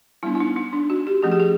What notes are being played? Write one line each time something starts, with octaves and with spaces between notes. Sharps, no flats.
G3 B3 D4 E4
E4
D#4
D#4
D4
F#4
G4
F3 A3 C#4 G#4
G4
G#4